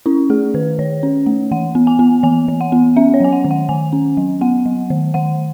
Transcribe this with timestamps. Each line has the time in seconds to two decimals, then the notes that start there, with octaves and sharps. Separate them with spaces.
0.06 C#4 E4
0.30 A3 G#4
0.54 D#3 B4
0.79 D#3 C#5
1.03 C#4
1.26 A3
1.51 E3 F#5
1.75 B3
1.87 G#5
1.99 B3
2.23 E3 G#5
2.48 E3
2.61 F#5
2.72 B3
2.96 C#4 E5
3.14 C#5
3.20 F#3 G#5
3.33 F#5
3.45 D#3
3.51 F#5
3.69 D#3 G#5
3.93 C#4
4.17 F#3
4.41 B3 F#5
4.66 F#3
4.90 D#3
5.14 D#3 F#5